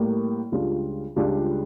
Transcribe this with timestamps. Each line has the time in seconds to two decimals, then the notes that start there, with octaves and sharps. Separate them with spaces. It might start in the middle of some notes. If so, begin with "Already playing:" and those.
Already playing: A2 G3 A#3
0.52 C#2 C#3 G3 D4 F4
1.16 C#2 C#3 G3 D4 F4